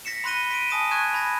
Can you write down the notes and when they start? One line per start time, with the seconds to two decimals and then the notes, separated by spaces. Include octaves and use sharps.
0.05 A#6 B6 C#7 E7
0.24 B5 C6 F#6 A#6 D#7 G7
0.51 B6 D7 D#7
0.69 G#5 A5 D#6 A#6 D#7 E7
0.91 C#6 F#6 G#6 D#7 E7
1.14 B5 G#6 A#6